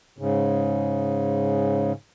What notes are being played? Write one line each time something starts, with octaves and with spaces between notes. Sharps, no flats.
G#2 C#3